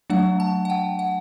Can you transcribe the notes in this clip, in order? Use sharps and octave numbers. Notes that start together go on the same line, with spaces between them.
F#3 A3 D4 F#5
A5
F#5
G5
F#5